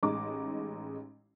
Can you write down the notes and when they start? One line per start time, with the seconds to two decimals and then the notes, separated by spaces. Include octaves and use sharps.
0.03 A1 G#3 D#4 A#5 D6